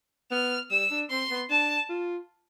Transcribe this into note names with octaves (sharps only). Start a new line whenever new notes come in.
B3 F6
G3 E6
D4
C4 C6
B3
D4 A5
F4